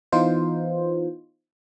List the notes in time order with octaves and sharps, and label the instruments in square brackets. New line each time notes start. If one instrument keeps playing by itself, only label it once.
[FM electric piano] E3 B3 D#4 F4 C5